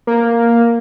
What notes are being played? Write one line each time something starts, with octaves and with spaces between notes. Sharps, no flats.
A#3